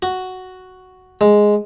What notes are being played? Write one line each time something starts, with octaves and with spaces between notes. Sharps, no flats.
F#4
G#3